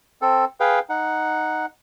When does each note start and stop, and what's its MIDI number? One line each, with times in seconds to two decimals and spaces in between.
0.22 0.45 60
0.22 0.45 69
0.60 0.79 68
0.60 0.79 71
0.60 0.79 77
0.60 0.79 79
0.89 1.66 63
0.89 1.66 78